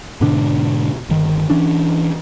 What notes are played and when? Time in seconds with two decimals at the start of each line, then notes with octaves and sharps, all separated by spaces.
0.21 G#2 B2 D3 D4
1.09 G1 D#3
1.50 E3 C#4 D4